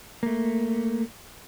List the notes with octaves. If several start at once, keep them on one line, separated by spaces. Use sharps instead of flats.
A3 A#3